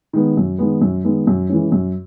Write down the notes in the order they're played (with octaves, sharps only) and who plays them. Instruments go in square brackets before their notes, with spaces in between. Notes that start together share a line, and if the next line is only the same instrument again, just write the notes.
[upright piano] D#3 G#3 B3
F#2
D#3 G#3 B3
F#2
D#3 G#3 B3
F#2
E3 G#3 C#4
F#2